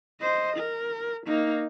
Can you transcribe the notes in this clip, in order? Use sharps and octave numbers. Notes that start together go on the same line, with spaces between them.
C5 D#5
A#4
A#3 D#4